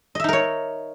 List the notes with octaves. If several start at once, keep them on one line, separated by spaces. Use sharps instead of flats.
D#4 A#4 C#5 D#5 E5